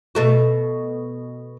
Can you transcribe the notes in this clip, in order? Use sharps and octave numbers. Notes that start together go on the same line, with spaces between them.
B2 A3 F#4